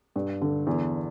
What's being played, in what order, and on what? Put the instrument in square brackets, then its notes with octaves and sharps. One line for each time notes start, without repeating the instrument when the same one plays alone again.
[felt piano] G2
D3
E2